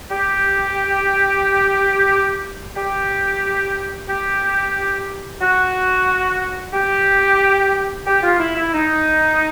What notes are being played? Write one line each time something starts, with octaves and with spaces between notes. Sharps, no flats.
G4
G4
G4
F#4
G4
G4
F4
E4
E4
D#4